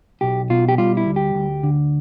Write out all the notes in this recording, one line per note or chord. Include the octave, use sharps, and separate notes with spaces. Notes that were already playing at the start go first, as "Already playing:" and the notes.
B1 G4
B2 F4
G4
G3 F4
E4
D2
G4
D2
D3